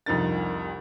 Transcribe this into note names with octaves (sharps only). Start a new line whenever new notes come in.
C2 F2 D4 D#4 A#4 A6